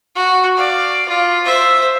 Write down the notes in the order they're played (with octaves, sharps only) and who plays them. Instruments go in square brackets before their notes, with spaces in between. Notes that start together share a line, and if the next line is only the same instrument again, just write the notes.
[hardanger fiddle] F#4
D5 F5
F4
C5 E5